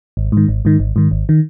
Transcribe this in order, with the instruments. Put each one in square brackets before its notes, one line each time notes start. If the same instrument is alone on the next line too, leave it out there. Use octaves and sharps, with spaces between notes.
[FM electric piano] G#1
G#2 D#3
G#1
G#2 D#3
G#1
G#2 D#3
G#1
D#3